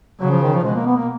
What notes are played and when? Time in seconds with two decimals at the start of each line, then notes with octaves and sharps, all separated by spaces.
0.20 C#3 F#3
0.31 F3
0.42 D#3
0.54 F3
0.64 B2 G#3
0.75 A#3
0.86 B3
0.97 A#3